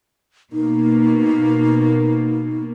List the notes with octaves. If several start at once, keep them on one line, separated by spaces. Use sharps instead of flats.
B2 A#3 D#4